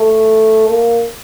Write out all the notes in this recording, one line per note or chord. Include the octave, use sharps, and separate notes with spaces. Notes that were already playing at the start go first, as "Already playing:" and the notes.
Already playing: A3
A#3